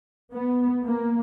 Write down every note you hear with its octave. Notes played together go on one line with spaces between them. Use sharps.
B3
A#3